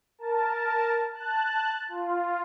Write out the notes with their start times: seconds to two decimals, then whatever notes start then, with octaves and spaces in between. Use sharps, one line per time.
0.19 A#4 A5
1.13 A5 F#6
1.88 F4